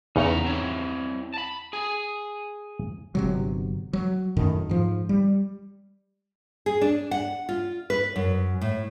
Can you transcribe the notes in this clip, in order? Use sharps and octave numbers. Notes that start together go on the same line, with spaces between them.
E2 C#3 D#4 F#5 A#5
C4 E4 C#5
A5 B5
G#4 G#5
G1 C3 F#3
F#3
F#2 A2 D#3
G#2 F3
G3
G#4
D4
F#5
F4
B4
F#2
A2